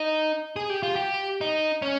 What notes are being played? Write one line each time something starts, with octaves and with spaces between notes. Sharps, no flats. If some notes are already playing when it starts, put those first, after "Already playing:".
Already playing: D#4
G#4
G4
F4
G4
D#4
C#4